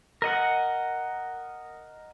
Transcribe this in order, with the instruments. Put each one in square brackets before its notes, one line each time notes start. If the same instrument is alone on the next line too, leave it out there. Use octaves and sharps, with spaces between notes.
[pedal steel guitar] A#4 D#5 F#5